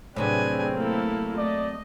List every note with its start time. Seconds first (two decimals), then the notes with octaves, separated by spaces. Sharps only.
0.16 A2 C3 F#3 C4 D4 G#4 B4 G#5
0.75 A3 A#3 E4 A4
1.37 A3 D5 D#5